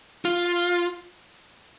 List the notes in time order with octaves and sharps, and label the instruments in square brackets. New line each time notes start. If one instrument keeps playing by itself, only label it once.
[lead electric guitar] F4